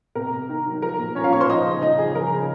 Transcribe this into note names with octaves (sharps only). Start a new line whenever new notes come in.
C3 A#4
C3
D#3
F#3
F3 A#4
A#2
F3 C#4 C#5
F4 F5
A#2 C#5 C#6
C5 C6
F3 D#4 D#5
C#3
F3 D#4 D#5
C#3 G#4
F3 A#4
C#3